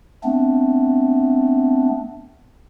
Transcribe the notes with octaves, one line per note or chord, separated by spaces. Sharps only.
A3 B3 C4 D4